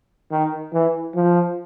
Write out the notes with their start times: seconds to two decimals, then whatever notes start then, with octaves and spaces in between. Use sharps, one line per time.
0.31 D#3
0.73 E3
1.14 F3